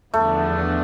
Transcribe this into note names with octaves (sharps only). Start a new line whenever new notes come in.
E2 D3 F3 A3 B3 D4